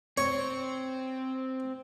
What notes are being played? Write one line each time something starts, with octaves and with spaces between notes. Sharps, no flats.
C4 C5 C#5